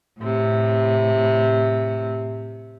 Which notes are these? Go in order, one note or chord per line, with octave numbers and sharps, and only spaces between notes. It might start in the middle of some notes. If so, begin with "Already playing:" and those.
A2 C3